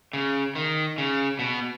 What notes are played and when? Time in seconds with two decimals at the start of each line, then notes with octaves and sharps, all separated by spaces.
0.13 C#3
0.55 D#3
0.98 C#3
1.39 B2